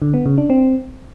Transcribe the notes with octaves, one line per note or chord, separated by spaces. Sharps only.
D3
B3
C#3
D4
C4